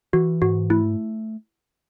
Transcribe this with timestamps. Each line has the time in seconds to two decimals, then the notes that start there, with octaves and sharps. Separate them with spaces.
0.13 E3 F#4
0.42 G#2 F#4
0.70 A3 E4